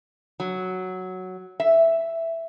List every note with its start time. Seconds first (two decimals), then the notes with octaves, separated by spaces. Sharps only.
0.40 F#3
1.60 E5